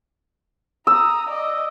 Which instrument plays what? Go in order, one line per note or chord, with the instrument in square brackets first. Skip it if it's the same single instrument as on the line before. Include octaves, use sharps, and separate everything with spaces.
[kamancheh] A#5 D#6 [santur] E6
[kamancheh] D5 D#5